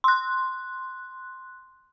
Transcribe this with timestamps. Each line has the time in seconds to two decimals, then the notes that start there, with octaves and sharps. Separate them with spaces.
0.04 C6 F#6